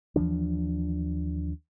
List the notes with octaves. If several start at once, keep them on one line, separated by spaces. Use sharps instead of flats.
D#2 E3 F3 D4